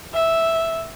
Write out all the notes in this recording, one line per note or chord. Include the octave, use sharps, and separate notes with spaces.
E5